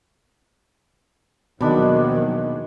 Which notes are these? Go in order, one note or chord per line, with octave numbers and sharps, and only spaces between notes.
D#2 B2 D#3 F3 F#3 G#3 D4 B5